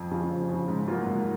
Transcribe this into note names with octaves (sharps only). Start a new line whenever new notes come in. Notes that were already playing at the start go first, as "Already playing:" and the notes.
Already playing: F2
C#3 F3
F2
C#3 F3
G#2
F#3 A#3 F4
G#2